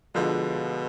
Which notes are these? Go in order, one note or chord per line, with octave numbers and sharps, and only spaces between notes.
B2 D3 F3 G#3